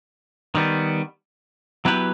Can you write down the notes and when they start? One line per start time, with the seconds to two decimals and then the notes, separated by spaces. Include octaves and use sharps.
0.55 D#3 G3 B3
1.85 F#3 B3 E4 G4 B4